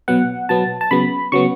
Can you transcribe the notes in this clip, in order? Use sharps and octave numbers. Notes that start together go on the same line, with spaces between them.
B2 F#3 B3 F#5
B2 F#3 B3 A5
A5
C#3 F#3 B3 B5
C#3 F#3 B3 C#6